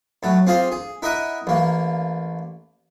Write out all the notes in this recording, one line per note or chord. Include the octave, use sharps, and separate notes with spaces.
A2 F#3
C4 F4 G4 G#4 C5
G#4
E4 A#4 D#5 E5 F#5 D#6
A1 A#3